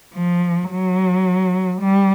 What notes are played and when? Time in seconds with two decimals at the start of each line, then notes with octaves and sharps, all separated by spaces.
0.14 F3
0.70 F#3
1.81 G3